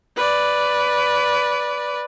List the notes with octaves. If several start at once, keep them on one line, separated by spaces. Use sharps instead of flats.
B4 D5